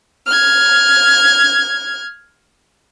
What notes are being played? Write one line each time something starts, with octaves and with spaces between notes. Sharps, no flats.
F6 G#6